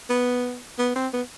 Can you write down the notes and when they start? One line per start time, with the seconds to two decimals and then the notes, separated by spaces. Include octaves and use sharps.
0.09 B3
0.78 B3
0.95 C4
1.13 B3